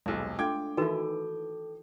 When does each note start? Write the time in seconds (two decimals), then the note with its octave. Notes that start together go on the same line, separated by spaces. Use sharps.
0.06 D#1 B1 G#3 A4
0.39 A3 D4 F4 G5 D6 G#6
0.77 D#3 E3 D#4 E4 F#4 A4 B4